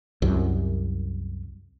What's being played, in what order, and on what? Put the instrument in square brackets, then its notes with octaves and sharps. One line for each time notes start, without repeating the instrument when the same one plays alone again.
[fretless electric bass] C2 F#2